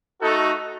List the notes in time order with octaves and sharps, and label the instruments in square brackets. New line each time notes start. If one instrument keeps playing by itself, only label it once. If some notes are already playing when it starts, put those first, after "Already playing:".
[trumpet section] A3 D#4 F#4 A4